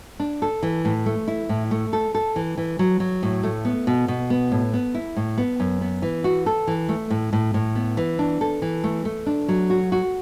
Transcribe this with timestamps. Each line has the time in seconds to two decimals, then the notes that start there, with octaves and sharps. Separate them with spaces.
0.20 D4
0.42 A4
0.63 E3
0.85 A2
1.06 A3
1.28 E4
1.49 A2
1.71 A3
1.93 A4
2.15 A4
2.36 E3
2.58 E3
2.79 F#3
3.00 F#3
3.23 A2
3.43 A3
3.65 B3
3.87 B2
4.08 B2
4.30 B3
4.52 A2
4.74 B3
4.95 E4
5.17 A2
5.38 B3
5.60 F#2
5.81 B3
6.02 E3
6.24 F#4
6.46 A4
6.67 E3
6.89 A3
7.10 A2
7.33 A2
7.54 A2
7.75 B3
7.97 E3
8.19 D4
8.41 A4
8.62 E3
8.84 A3
9.05 A3
9.26 D4
9.48 F#3
9.70 F#4
9.92 F#4